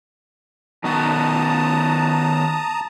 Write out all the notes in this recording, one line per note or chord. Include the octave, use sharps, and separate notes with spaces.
D#3 B3 F#4 A5 A#5 D#6